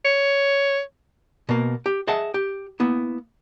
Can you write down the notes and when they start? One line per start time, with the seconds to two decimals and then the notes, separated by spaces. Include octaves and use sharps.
0.05 C#5
1.49 B2 A#3
1.86 G4
2.07 G#4 D#5 E5 F#5 A5
2.34 G4
2.80 A#3 B3 E4